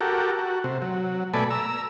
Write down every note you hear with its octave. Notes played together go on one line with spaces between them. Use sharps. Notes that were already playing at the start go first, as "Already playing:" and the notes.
F#4 G4 A4 A#4
F#4
C3
F#3
B2 A3 A4 D5 G#5 B5
A#5 E6